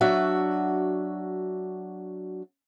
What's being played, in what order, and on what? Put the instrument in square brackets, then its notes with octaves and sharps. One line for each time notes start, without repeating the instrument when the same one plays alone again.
[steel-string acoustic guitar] F#3 D4 F#4 E5